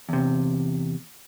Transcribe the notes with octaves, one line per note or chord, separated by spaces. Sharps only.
E2 C3